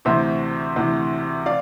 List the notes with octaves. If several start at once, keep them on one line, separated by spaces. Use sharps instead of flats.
D2 C3 E3 C5 E5
D2 C3 E3
D5 F5